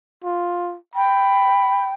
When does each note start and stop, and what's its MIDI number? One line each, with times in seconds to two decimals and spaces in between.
0.24 0.76 65
0.95 1.93 79
0.95 1.91 83